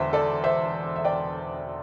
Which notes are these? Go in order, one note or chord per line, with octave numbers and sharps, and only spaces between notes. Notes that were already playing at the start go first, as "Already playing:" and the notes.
Already playing: E1 E2 D3 C5 E5
A4 D5
C5 E5
E5
D5 G5